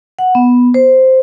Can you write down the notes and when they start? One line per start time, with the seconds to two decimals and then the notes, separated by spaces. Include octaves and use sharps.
0.19 F#5
0.35 B3
0.74 C5